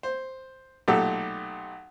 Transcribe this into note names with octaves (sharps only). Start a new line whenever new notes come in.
C5
B1 A#2 A3 G4 A4